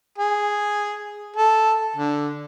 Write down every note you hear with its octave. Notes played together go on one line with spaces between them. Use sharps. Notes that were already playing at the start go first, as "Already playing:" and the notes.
G#4
A4
D3